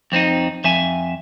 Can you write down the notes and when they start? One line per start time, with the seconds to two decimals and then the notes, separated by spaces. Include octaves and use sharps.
0.12 F2 C4 D4 D#4
0.64 F2 E5 G#5